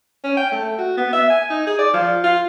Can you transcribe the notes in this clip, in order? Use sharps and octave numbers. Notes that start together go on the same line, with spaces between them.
C#4
G5
A3
F#4
B3
E5
G#5
D#4
G#4
D5
F3
F4